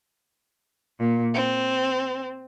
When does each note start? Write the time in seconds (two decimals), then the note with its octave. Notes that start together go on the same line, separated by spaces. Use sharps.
1.01 A#2
1.35 C4